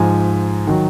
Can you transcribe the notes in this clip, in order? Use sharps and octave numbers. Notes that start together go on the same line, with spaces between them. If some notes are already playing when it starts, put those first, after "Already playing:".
Already playing: G#2 F3 G#5
D#3 F#3